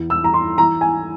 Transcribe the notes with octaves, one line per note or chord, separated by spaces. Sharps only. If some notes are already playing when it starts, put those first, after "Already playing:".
Already playing: E2
E6
E3 A#5
C6
E3 A#5
G#5